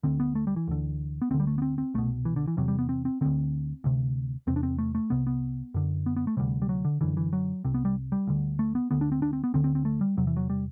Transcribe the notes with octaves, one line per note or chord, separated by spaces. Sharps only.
D2 D3 C4
B3
A3
G3
E3
D2 D3
B3
D2 D3 C4
G3
A3
B3
C4
C4
C2 B2 A3
E3
D3
E3
E2 C3 F#3
G3
B3
C4
C4
D2 D3 C4
D2 C3
E2 C3 C4
D4
C4
A3
A3
C2 C3 B3
B3
F#2 D3
B3
B3
A3
D2 C3 G3
G3
F#3
D3
F#2 D3 E3
E3
F#3
C2 C3 C4
B3
G3
G3
D2 D3
A3
B3
D2 D3 B3
D4
C4
D4
C4
B3
D2 D3 C4
C4
C4
A3
G3
E2 C3 F#3
E3
F#3
G3